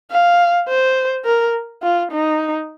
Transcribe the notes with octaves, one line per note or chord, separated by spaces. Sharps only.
F5
C5
A#4
F4
D#4